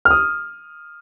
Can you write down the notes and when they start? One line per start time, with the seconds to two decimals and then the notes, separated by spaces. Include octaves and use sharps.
0.05 F6
0.11 D#6